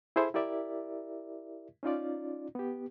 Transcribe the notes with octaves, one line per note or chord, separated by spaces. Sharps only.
E4 G#4 A4 C5 E5 B5
E4 G4 A#4 D5 E5
C#4 D#4 F4 D5
B3 G4